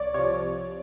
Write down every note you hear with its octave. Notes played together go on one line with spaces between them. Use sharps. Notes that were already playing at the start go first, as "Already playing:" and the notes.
Already playing: C2 C#5 D5
C3 F3 C#5